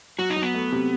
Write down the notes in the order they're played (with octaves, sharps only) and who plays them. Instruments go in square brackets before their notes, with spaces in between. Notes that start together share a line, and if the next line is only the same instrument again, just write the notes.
[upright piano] F#3 [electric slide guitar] F#4
[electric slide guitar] D#4
[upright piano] F#3
[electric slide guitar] B3
[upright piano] A3
C3